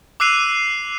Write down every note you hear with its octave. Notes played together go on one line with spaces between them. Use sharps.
D6 E6 F#6 C7 D#7 F7